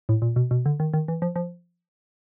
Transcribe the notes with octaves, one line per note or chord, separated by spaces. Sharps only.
A2
A#2
B2
B2
D3
D#3
D#3
E3
F3
F3